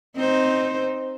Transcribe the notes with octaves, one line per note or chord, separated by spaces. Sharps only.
C4 D#4 C5